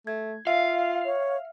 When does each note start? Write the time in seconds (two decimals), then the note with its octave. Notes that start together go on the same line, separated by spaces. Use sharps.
0.07 A3 G#6
0.47 F4 E5 F5
1.05 C#5